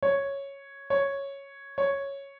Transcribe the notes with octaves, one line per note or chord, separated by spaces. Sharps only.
C#5
C#5
C#5